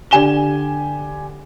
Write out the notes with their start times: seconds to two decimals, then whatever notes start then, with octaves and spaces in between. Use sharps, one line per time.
0.11 D3 G4 G#5 E7 G7